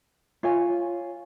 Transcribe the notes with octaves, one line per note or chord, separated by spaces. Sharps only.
F4 C#5 G#5